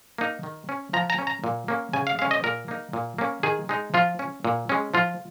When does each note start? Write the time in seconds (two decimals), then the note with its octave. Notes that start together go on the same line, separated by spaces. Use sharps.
0.18 A#3 D#4
0.43 D#3
0.69 C#4
0.93 F3 A#5
1.10 A#5
1.18 C#4
1.27 A#5
1.44 A#2
1.68 A#3 C#4
1.93 C#3 G#5
2.07 F5
2.19 G#3 C#4 F5
2.31 D#5
2.44 A#2 A#4
2.68 A#3 D#4
2.93 A#2
3.18 A#3 C#4
3.43 D#3 G#4
3.69 G#3 D#4
3.94 F3 F4
4.19 C#4
4.45 A#2
4.69 G#3 C#4
4.94 F3 F4